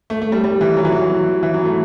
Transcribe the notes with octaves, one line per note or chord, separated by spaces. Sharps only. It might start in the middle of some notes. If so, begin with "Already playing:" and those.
A3
A3
G3
G3
E3
F#3
E3
F#3
E3
F#3
A3